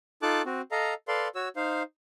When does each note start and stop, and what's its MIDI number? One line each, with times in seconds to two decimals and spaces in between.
0.22 0.42 63
0.22 0.42 65
0.22 0.42 69
0.22 0.42 81
0.22 0.42 86
0.22 0.42 90
0.46 0.61 60
0.46 0.61 66
0.71 0.94 69
0.71 0.94 75
0.71 0.94 77
0.71 0.94 82
1.08 1.28 69
1.08 1.28 71
1.08 1.28 74
1.08 1.28 77
1.08 1.28 84
1.35 1.48 66
1.35 1.48 73
1.35 1.48 88
1.56 1.83 63
1.56 1.83 72
1.56 1.83 77